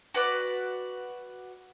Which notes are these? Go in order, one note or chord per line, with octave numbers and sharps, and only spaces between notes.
F#4 B4 D5